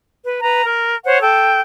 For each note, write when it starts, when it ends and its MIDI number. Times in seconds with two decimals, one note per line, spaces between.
0.24 0.41 71
0.41 0.64 71
0.41 0.64 82
0.64 0.95 70
1.05 1.20 72
1.05 1.20 73
1.05 1.20 78
1.21 1.59 69
1.21 1.59 79